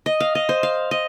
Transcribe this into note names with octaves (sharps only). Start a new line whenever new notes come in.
D#5
F5
D#5
C5
F5
D#5